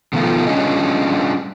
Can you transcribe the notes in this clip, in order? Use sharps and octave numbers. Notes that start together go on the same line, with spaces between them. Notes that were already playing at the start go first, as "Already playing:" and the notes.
B2 D#3 F3 A3 F4
G3 C#4 D4 F4 G#4 D#5